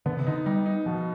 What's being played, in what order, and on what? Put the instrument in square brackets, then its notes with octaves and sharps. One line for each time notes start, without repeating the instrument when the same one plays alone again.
[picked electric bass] D3 [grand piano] B3
[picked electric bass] C3
[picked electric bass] D3 [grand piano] D#4
[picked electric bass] G3 [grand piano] D#4
[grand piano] D#4
[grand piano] B2 [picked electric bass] F3